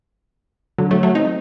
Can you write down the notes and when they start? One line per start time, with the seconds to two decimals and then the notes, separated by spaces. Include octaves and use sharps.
0.78 D3 F#3
0.91 F#3 A3
1.03 F#3 A3
1.15 C4 D#4